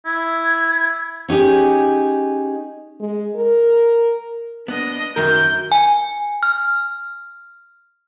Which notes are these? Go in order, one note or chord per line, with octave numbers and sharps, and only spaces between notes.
E4 G#6
C#4 D#4 G4 G#4
G#3
A#4
B3 D4 D#5
F#2 D#3 A#4 G6
G#5
F6